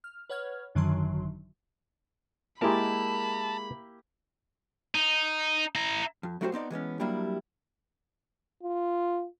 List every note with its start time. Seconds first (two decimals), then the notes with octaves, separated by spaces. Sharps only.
0.04 F6
0.29 B4 C#5 F#5 F6 G#6
0.75 G#1 F#2 D3 D#3 F#3 C6
2.62 G#3 A#3 E4 G4 A#4 A5 B5
4.95 D#4
5.75 E4 A#5
6.23 F2
6.41 F#3 A3 E4 F#4 G4 C5
6.52 B3 C4 D#4 D5
6.70 E3 G#3 B3 C#4
7.00 F#3 G3 A#3 D4 E4 G4
8.63 F4